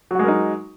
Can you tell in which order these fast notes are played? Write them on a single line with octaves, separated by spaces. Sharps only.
F#3 F#4 G#3 A#4 D#4